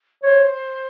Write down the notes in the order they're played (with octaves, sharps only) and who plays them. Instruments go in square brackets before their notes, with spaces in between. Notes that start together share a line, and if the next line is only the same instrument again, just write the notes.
[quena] C5 [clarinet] C#5